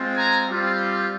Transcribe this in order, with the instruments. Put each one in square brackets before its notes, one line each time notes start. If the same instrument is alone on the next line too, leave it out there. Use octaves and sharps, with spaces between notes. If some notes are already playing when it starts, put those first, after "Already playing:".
Already playing: [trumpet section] G#3 C4 F4
G#5 A#5
G3 C4 F4